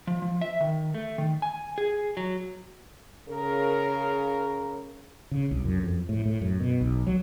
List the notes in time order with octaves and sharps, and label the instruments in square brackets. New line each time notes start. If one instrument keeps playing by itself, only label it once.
[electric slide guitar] F3
F3
E5
D#3
A3
D#3
G#5
G#4
F#3
[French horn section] C#3 A#4
[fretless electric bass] C#3
C2
F#2
F2
A2
A2
F#2
B2
B1
F#3